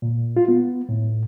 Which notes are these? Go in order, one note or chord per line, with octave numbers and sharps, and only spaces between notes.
A#2
F4
B3
A2